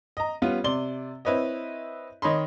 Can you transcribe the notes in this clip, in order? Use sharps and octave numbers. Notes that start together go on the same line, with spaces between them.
D#5 A#5
G3 B3 C#4 F4
C3 D5 C6 G7
C4 E4 B4 C#5 D#5
D#3 C#5 D#5 B5 C6